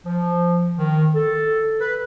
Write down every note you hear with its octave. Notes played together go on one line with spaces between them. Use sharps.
F3
D#3
A4
B4